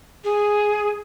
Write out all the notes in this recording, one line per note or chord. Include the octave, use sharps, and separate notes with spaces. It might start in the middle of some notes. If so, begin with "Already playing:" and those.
G#4